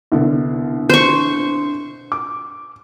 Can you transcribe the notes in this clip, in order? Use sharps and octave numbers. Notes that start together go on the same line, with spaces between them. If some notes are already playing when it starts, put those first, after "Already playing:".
C2 B2 D3
C5 C#6
D6